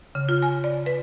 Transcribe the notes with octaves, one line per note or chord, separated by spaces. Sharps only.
C#3
F4
G#5
D5
B4